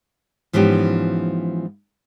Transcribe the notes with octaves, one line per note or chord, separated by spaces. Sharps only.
G#2 E3 F3 B3 C#4 G4